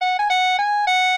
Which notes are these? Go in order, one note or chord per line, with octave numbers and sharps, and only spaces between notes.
F#5
G#5
F#5
G#5
F#5